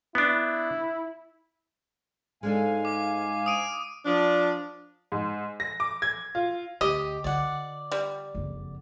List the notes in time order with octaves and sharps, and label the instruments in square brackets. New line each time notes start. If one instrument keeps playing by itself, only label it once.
[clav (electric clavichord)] B3 D4 [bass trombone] E4
[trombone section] G#2 [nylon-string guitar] G#3 D4 A4 [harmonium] F5 G#5
[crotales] D6
D#6 D7 D#7
[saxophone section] F3 D4
[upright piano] G#2
A#6
D6
G#6
F4
[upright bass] D2 [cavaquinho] G4 [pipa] D#5
[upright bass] D3 F4 [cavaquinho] D5 F#5
[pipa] G3
[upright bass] F#1 F2